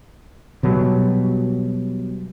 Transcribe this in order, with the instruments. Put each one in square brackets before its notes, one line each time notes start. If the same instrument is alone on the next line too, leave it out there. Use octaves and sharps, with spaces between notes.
[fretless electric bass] B2 F#3 G3